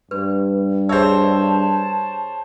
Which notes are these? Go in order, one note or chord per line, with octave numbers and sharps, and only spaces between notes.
G2 B4
G#4 C5 C#5 E5 A5 E6